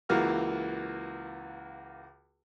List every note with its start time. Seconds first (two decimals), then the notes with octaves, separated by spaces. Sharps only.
0.09 C#2 E3 A#3 F#4 F6